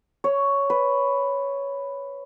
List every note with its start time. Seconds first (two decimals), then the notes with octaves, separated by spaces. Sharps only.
0.24 C#5
0.70 B4